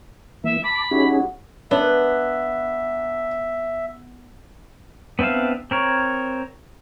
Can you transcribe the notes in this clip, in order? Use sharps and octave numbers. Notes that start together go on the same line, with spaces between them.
E3 A#3 E5
A5 B5 D6
G3 C#4 D#4 E4 F#4 G#4
B3 D4 E5
B3 C4 D4 E5 F5
C4 A#4 C#5